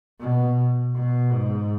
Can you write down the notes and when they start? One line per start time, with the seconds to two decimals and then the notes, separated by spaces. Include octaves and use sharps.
0.21 B2
0.95 B2
1.32 G#2